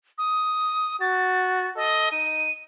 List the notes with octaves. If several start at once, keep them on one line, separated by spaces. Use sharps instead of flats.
D#6
F#4 A6
A4 D#5
D#4 D#7